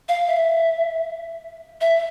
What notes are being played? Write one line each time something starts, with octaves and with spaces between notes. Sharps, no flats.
F5
E5
E5